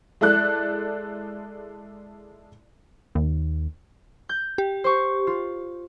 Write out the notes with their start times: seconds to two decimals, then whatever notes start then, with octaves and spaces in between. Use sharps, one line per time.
0.21 G#3 E4 A4 D5 F#6
3.15 D#2
4.29 G6
4.58 G4
4.84 C5 C#6
5.27 F4